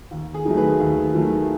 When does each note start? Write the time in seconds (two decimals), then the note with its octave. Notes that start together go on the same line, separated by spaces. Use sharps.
0.11 D#2
0.34 G#4
0.45 D#3 F#3 A3
0.57 G#4 B4
0.80 D#2
1.15 D#3 F#3 A3